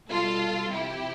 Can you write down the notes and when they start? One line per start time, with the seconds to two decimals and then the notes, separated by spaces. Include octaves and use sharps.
0.09 B2 G3 F4 A4
0.72 C3 F3 E4 G4